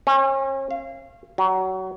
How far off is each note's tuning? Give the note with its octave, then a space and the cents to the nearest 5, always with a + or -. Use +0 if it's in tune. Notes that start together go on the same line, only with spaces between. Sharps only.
C#4 -40
F5 -25
F#3 +25